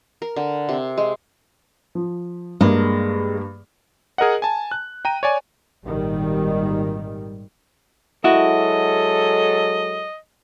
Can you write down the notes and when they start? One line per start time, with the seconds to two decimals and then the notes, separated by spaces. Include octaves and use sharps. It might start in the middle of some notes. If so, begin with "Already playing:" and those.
0.22 A#4
0.36 D3
0.69 C3
0.98 G#3
1.95 F3
2.61 G2 G#3 A#3
4.18 G#4 A#4 D#5 F#5
4.42 G#5 A5
4.71 F#6
5.05 G5 A#5 D#7
5.23 C#5 D5 G#5
5.85 G#1 A#2 D#3 G3
8.24 F#3 G#3 E4 F#4 A4 D#5